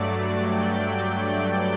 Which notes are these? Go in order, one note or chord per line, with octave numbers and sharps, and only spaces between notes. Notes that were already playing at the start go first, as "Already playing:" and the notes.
Already playing: G2 F#3 A3 D5
G5